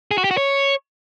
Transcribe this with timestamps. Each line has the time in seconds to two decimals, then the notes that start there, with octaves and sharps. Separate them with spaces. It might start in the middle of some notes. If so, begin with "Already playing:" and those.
0.11 G#4
0.18 F#4
0.24 G4
0.31 F#4
0.37 C#5